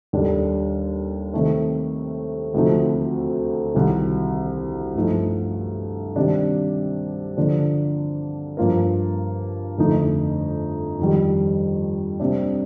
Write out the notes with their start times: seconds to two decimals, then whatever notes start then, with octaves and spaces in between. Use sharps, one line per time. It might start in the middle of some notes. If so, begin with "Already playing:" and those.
0.13 D#2 D#3 G3 D4 A4
1.33 C3 D#3 A3
2.54 D2 C3 F3 A3 D#4
3.74 C2 C3 D#3
4.95 G2 F3 A3 D#4
6.16 C3 D#3 G3 D4
7.37 D3 F3 A#3 D4
8.57 G2 F3 A#3 F4 A#4
9.78 F2 D3 A3 D#4
10.99 F2 D#3 G3
12.20 C3 G3 A#3 D4